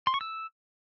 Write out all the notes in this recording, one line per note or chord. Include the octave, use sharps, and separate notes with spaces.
C6
C#6
E6